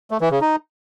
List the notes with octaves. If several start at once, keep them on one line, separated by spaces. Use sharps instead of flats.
A3
E3
C#3
D#4